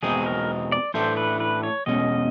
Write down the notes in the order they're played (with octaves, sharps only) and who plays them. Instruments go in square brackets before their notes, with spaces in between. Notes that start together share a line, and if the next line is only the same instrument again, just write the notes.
[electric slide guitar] E2 B2 G#3 C4 D#4 [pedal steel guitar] G#4
[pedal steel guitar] A#4
D5
[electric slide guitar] A2 E3 A3 D4 [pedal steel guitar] C5
[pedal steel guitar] B4
B4
C#5
[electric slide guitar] E2 B2 G#3 C#4 [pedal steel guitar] D#5